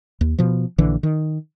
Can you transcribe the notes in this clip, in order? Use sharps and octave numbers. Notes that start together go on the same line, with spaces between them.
D#2
B2 F3
A#1 D3 E3
D#3